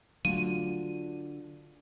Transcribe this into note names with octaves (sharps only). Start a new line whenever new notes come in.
D3 F#3 A3 F4 F#4 D#7